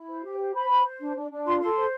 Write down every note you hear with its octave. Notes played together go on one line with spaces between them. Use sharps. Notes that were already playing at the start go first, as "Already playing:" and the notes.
Already playing: E4
C5
G4
C5
C5 B5
C5
C5
D4
D4
D4
F4 C6
A4 C6
C5